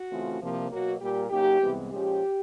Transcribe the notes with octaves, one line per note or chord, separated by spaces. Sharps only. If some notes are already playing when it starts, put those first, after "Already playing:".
Already playing: F#4
C#3 E3 A3 C4 F4
C2 C3 F3 A#3
B2 F#3 A#3 F#4
A#2 G3 A#3 G4
C#3 F#3 A#3 D#4 G4
C2 C3 E3 G#3 B3
A#2 F3 G#3 C#4 G4